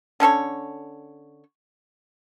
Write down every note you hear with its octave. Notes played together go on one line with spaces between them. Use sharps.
D3 C#4 A4 C#5